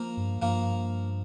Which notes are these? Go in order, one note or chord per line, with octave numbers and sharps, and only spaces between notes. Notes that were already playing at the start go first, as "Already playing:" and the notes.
Already playing: F3 A#3
G2
G2 F3 A#3